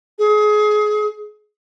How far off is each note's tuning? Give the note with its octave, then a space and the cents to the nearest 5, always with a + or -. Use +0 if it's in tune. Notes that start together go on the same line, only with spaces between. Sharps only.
G#4 +25